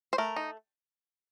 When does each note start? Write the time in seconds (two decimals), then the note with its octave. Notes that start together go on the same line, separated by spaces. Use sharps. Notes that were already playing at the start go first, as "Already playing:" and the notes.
0.13 C5
0.18 A3 A#4
0.36 D#4